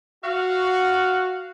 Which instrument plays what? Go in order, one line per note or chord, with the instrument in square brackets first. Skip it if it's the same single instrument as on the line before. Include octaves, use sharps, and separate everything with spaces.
[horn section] F#4 [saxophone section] F5